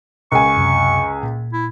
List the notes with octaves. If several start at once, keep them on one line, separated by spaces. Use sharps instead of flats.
C#2 A#4 G#5 C#6
F#2 C3
A#2
E4